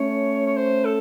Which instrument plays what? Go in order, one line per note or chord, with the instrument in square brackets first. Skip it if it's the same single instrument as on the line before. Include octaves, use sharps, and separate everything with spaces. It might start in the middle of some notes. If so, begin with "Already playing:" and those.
Already playing: [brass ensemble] A3 C#4 [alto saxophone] C#5
[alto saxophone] C#5
C5
A4